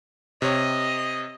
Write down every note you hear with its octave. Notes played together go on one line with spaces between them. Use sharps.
C3 C#5 D#5